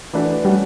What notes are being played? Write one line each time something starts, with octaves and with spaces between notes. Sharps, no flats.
E3 A3 D4 F#4 B4
G3 A3 C#4 F#4